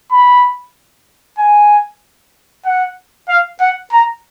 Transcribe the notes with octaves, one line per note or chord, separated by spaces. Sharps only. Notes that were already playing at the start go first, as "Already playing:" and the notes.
B5
G#5
F#5
F5
F#5
A#5